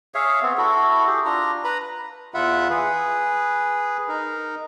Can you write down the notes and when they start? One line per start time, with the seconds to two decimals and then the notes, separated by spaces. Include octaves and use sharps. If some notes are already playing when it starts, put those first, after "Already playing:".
0.15 G#4 C#5 E5 F5
0.42 B3 C4
0.58 E4 F#4 A4
1.07 G4 G#4
1.25 D4 F4 A#5
1.64 B4 A#5 B5
2.34 E2 F4 E5 F#5 B5
2.70 G#4 B4
4.09 D#4 A#4